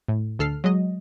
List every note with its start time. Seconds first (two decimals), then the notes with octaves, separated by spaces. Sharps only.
0.08 A2
0.39 D2 A4 F6 C7
0.64 F#3 G#3 D#5